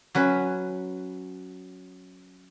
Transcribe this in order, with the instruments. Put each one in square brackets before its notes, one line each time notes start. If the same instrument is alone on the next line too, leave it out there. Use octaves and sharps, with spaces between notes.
[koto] F#3 C#4 B4